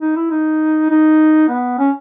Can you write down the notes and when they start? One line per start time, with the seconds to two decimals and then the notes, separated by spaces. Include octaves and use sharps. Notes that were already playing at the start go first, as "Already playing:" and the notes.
0.01 D#4
0.16 E4
0.31 D#4
0.90 D#4
1.49 B3
1.79 C#4